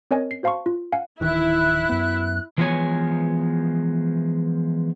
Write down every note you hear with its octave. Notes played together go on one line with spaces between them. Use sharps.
C4 A#4 C#5 D#5 G#5
C7
F#4 C5 F5 A5 C6 C#6
F4
F5 F#5 G#5
D1 D#3 E3 E4 F#6
F#2 B3
E3 F3 G#3 B3 C#5 G#5